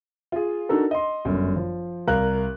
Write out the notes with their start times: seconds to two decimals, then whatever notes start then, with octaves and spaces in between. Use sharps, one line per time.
0.32 F4 G#4
0.69 D4 D#4 F#4 A4 A#4
0.91 D#5 C6
1.25 G1 F#2
1.56 F3
2.07 C2 A#4 F5 F#6